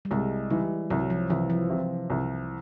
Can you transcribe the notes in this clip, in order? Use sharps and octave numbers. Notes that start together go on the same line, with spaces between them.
G3
C2 G#3
E3 G3
C2 F#3
F3
C2 E3
F3
C3
C2